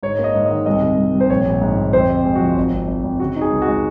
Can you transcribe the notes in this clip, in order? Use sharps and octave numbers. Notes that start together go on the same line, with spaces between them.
G#2 C#5
A#3
D#5
G#2
D#3 D#5
C2 D#5
C3
C2
C2
C5
A#1 C#5
A#1
G#2
A#1
F2 C5
C3
G#3
F#4
F3
G#1
G#1
G#1
G#1
C#3 F#4
D#4
G#4
C#2
F#4
G#3